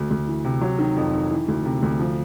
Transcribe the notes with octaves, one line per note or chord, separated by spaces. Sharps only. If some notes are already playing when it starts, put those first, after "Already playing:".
Already playing: D2
D2
E3
C3
F#3
D#3
F2
D#3
E3
D2
C3
D2
F3